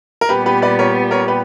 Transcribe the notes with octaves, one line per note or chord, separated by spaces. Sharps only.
A#4
A#2 G3 B3 G4 B4
G4 B4
B4 D5
A#4 C#5
A#4 C#5
G4 B4